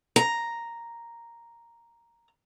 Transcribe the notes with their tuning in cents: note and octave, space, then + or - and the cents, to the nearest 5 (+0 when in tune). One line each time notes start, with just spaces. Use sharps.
A#5 +0